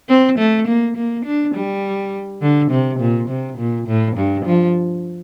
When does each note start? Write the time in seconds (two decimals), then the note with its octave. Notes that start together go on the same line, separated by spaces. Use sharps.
0.09 C4
0.39 A3
0.68 A#3
0.97 A#3
1.25 D4
1.54 G3
2.42 D3
2.71 C3
2.99 A#2
3.29 C3
3.58 A#2
3.87 A2
4.16 G2
4.45 F3